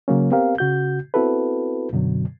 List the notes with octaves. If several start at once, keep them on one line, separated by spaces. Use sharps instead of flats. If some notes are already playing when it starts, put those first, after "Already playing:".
C#3 F#3 A#3 C#4
B3 C4 G4 A#4 F5
C#3 F#4 G6
B3 C4 E4 F#4 A4 B4
F#2 B2 D3 F#3